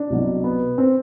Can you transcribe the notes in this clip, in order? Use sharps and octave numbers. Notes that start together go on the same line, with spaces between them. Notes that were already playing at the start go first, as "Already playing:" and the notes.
Already playing: D4
C2 B2 F#3
B3
C4